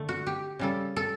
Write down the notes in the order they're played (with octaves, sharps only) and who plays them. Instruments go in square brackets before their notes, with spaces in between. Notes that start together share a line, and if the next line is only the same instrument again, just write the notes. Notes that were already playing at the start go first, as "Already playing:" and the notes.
Already playing: [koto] D3 A3
F#4
G4
C#3 G3 A4
A4